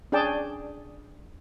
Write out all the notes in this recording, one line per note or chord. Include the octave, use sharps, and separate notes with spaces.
C#4 D4 G#4 D5 G5 A5